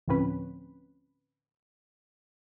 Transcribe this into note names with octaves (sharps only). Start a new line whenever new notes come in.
D2 A2 F3 C4 C#4 B4